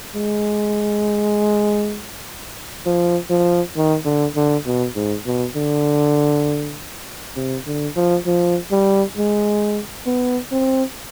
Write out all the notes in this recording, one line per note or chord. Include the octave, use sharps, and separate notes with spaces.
G#3
F3
F3
D#3
D3
D3
B2
G#2
B2
D3
C3
D3
F3
F3
G3
G#3
B3
C4